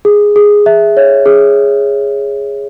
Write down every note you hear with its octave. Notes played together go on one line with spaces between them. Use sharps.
G#4
G#4
E5
C#5
G#4